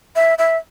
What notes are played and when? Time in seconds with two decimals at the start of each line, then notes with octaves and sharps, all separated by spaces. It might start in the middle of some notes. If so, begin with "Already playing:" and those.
0.16 E5
0.38 E5